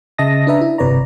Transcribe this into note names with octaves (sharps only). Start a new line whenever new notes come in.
C#3 D#5 E5 A5 D#6 A#6
D4 B4 E5 A#5
E4
G1 C3 B4 C#5 D5 A#5